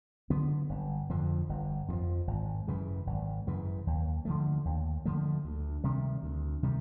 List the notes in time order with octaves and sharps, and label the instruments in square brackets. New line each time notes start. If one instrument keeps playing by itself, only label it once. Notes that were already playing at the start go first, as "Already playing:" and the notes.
[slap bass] D3 F#3 B3
G1
F2 D3 F3
G1
F2 D3
F3
G#1
F#2 C#3 E3
G#1
F#2 C#3 E3
D#2
D3 F3 A3
D#2
D3 F3 A3
D2
C3 D#3 G3
D2
C3 D#3 G3